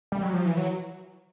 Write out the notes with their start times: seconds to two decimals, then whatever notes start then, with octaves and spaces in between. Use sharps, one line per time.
0.12 G3
0.23 F#3
0.33 F3
0.45 E3
0.57 F#3